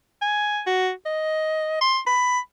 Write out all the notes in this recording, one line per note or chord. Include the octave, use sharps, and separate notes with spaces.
G#5
F#4
D#5
C6
B5